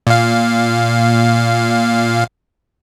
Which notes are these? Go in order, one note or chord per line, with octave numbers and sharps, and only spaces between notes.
A#2 F5